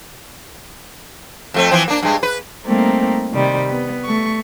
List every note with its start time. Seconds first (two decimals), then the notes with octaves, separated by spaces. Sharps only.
1.54 F2 A3 C4
1.71 E3 F3 C4
1.88 A#3 D4
2.03 G2 G#3
2.23 B4
2.66 G3 A3 A#3 C4 D#4
3.33 C3 D#3 G3
3.70 B3
4.05 A3 C#6